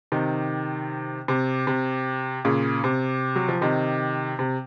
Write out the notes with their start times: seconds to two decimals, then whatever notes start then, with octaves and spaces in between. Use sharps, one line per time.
0.12 C3 D#3
1.28 C3
1.67 C3
2.45 A#2 C#3
2.84 C3
3.36 F#3
3.49 F3
3.61 C3 D#3
4.39 C3